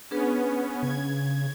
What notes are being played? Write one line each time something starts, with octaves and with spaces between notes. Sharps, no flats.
B3 C#4 D4 G#4 B4
C#3 G#6